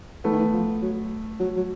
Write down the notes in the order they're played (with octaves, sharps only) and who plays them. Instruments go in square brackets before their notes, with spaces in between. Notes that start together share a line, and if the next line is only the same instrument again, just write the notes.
[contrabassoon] E3 [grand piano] A3 B3
[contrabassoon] D#3
E3
F3
F#3
F#3
F#3